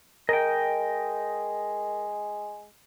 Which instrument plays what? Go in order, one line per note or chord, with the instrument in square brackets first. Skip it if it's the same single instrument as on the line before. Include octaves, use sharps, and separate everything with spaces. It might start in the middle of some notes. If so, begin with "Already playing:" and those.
[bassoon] G#3 [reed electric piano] A#4 [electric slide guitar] D#5 G5